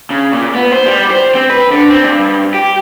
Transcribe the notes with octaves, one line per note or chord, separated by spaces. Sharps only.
C#3
A#2
B3
C5
G3
C5
C4
B4
D3
C4
G2
G4